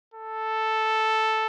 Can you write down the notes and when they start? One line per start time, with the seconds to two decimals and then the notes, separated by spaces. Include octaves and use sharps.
0.14 A4